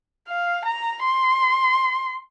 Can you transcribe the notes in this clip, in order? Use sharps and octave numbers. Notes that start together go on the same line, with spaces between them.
F5
A#5
C6